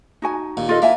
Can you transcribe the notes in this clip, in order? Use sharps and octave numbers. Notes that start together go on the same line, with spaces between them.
D#4 F#4 G#5
D#2 A#2
F4 A4 D#5
A#3 E4 E5 G#5